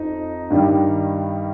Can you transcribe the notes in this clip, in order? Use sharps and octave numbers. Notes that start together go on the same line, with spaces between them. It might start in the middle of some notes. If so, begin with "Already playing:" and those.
Already playing: F2 D#4
G2 D#3 G3